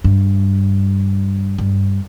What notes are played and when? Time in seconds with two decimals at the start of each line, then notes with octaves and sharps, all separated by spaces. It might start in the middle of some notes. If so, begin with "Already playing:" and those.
0.04 G2
1.58 G2